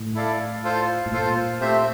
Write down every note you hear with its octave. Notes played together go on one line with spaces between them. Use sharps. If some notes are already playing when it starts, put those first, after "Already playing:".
Already playing: A2
E4 A4 D5 F5
F4 A4 C5 F5
A2
A#2 F4 A4 C5 F5
A3 C4 G4 C5 E5